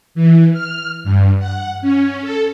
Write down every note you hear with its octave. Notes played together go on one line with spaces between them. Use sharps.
E3
F6
G2
F#5
C#4
A4